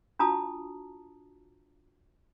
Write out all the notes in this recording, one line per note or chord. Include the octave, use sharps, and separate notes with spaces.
D4 F4 F#4 A5 A#5 D#6